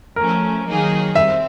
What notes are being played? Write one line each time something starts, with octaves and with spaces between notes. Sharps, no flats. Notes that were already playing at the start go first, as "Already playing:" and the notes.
F3 A3 C#4 A#4
D#3 F#3 A#3 D#4 G#4
G3 C4 E5